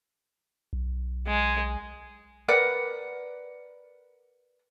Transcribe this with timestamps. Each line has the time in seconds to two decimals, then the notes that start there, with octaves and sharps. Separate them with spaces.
0.73 B1
1.27 G#3
2.48 A#4 B4 D5 F#5